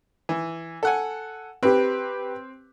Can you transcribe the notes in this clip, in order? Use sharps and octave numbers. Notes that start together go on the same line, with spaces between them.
E3
A4 F#5 G#5
C4 G4 B4